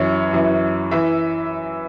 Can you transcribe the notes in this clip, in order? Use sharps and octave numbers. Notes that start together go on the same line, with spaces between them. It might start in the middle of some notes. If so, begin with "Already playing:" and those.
Already playing: F#2 E3 C#5
F#2 E3
E3 E5